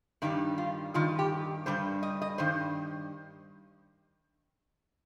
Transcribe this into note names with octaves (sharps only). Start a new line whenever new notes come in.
G2 D#3 G3 D#4
F4
G2 D#3 F4
G4
G2 D#3 G3 C5
D#5
D#5
G2 D#3 C5